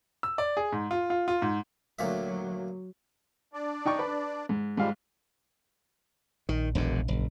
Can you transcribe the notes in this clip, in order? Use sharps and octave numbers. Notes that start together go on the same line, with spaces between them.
E6
D5
G#4
G#2
F4
F4
F4
G#2
D2 A#2 F#3 E5
D4 D5
D#4 G5 C#6
B4
G#2
G#2 F3 G3 G#3 F5
A#1 D#3
E1 A#1 F#2 D3
F#1